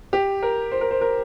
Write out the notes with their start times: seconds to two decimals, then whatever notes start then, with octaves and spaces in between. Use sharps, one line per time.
0.13 G4
0.43 A#4
0.72 C5
0.81 A#4
0.91 C5
1.01 A#4